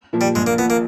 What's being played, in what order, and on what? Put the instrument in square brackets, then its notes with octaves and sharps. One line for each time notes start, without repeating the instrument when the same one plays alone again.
[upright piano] A#2 F3
[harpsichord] G3
[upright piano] A#1 [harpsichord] G#3
[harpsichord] A#3
[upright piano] A#2 F3 [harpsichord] B3
[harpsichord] A#3